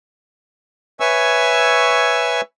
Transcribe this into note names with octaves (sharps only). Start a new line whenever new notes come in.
B4 C#5 E5 G#5 C#6 E6